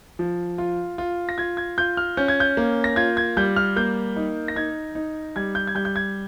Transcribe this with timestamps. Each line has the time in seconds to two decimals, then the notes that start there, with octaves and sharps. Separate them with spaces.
0.19 F3
0.58 F4
0.98 F4
1.29 A#6
1.38 F4 G#6
1.57 G#6
1.78 F4 G6
1.97 F6
2.17 C#4 G6
2.28 G#6
2.40 G6
2.57 A#3
2.84 A#6
2.96 F4 G#6
3.17 G#6
3.37 G3 G6
3.56 F6
3.76 A#3 G6
4.16 D#4
4.48 A#6
4.56 D#4 G#6
4.95 D#4
5.36 G3 G#6
5.55 G6
5.67 G#6
5.75 G3 G6
5.85 G6
5.96 G#6